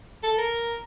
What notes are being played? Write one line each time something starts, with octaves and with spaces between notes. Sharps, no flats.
A4
A#4